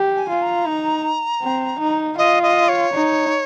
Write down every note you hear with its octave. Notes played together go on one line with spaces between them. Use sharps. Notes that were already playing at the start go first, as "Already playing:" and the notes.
Already playing: G4
G#5
F4
A#5
D#4
C4
D#4
F4 D#5
D#5
C#5
D#4